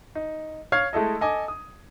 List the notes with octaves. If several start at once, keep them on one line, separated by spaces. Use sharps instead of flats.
D#4
C#5 F5 F6 G#6
G#3 A3 E4 A4 D#5
A4 D#5 G#5 D6
D#6